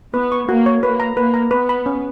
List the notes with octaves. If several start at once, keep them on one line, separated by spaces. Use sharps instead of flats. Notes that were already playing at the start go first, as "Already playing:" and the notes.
B3 B4
C#6
A#3 F#4
C#5
A#3 B4
A#5
A#3 B4
A#5
B3 B4
B5
C#4